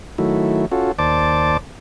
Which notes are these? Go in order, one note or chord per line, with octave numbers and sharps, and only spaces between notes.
D#3 F#3 A3 E4
C#4 F4 F#4 A4
D#2 C5 D5 A5 D6